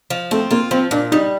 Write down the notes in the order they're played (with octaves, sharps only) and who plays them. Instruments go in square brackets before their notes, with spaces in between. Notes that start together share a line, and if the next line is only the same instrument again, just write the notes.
[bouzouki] F3
[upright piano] A3 [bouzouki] C4
[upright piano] A#3 [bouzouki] F4
[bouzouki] F3 [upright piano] C4
[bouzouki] A#2 [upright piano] D4
[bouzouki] G3 [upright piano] D#4